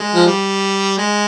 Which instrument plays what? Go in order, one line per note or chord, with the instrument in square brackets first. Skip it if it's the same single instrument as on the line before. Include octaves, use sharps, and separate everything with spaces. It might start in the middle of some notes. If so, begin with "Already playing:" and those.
Already playing: [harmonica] G#3
F3
G3
G#3